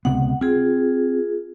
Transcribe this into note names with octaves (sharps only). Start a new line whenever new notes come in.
C#2 C3 B3 F#5
C4 F4 G#4